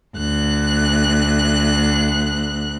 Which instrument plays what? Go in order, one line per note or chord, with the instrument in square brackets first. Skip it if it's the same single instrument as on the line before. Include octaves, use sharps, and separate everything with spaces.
[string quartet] D2 F#6